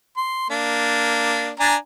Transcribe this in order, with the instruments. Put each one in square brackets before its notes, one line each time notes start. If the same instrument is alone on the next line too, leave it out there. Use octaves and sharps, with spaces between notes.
[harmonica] C6
A#3 D4
D4 G#5 A#5